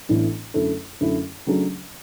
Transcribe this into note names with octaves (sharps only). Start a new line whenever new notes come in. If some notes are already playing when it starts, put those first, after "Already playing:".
A1 A2 E3 B3 D4
F#2 D3 A3 E4 A4
F#2 D3 A3 E4 A4
C#3 F#3 A3 D4 G#4